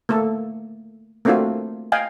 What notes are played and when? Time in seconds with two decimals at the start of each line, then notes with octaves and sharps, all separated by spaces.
0.09 A3 A#3 A4
1.25 A3 A#3 C4 D4 F4 F#4
1.92 D#5 F5 G5 G#5